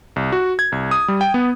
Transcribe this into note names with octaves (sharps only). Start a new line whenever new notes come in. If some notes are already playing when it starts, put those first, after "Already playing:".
C2
F#4
G#6
C2
D#6
G3
G5
B3